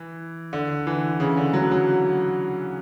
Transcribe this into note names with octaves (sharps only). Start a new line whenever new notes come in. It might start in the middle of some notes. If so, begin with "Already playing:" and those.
Already playing: E3
D3
E3
C#3
D3
F#3
F#3